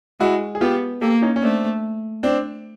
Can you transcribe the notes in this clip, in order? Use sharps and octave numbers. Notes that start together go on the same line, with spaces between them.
G#3 E4 F#4
G#4
B3 F4 G4
A#3 G4 A4
C#4 D#4
C#4
A3 C4 D4
C4 D4